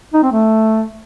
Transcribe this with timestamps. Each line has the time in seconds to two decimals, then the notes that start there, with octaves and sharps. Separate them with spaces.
0.14 D#4
0.23 C4
0.32 A3